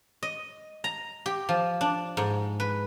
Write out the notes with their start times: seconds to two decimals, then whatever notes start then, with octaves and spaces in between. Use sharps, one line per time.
0.23 D#5
0.84 A#5
1.26 G4
1.49 F3
1.81 D4
2.17 G#2
2.60 B4